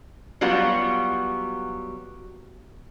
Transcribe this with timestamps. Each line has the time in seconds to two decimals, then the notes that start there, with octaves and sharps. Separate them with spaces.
0.41 F#3 G3 B3 F4 F#4